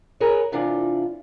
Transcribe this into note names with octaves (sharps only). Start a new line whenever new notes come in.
G#4 A#4 B4 C#5
C3 E3 D4 F4